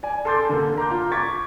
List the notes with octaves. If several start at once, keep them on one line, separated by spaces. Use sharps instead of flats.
D5 G#5
A4 A5 C6 D6 G6 A6
D3 A#3
A#5 C6 D6 G6
F4
C#6 D6 G#6 A6 B6